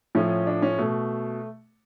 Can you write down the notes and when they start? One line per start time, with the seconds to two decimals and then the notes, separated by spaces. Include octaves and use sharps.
0.15 A2 F3 C#4
0.47 D4
0.62 C#4
0.79 B2 A3